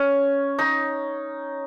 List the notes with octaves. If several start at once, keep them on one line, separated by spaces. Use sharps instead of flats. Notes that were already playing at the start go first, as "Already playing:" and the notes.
Already playing: C#4
D#4